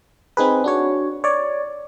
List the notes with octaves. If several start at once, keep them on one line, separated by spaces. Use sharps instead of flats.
C4 D#4 G#4 B4
D4 F#4 C#5
C#5 D5